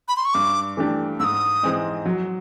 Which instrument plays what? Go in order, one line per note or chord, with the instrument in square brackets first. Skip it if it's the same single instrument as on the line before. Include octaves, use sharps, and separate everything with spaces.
[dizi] B5
C6
C#6
[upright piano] G2 [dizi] D6
[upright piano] E3 A3 D4 G4
[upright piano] G#2 [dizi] E6
[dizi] D#6
[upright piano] E3 G#3 C4 D#4
F#3